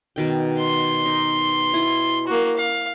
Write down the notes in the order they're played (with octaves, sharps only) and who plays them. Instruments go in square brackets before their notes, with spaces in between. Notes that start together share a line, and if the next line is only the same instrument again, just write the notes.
[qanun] B2 D#3 G5
[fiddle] C6
[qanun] D#4
E4
[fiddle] A#3 F#4
F5